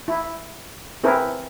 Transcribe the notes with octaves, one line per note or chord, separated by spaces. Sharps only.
E4
C4 E4 G#4 A#4 B4